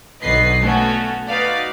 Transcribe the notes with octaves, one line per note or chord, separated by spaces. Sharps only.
B1 B2 D3 B4 D#5 C7
A3 B3 C#4 F#4
D#4 F#4 B4 D5 F5